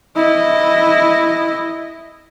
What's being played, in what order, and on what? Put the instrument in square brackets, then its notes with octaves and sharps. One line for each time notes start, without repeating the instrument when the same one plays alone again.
[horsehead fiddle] E4 D#5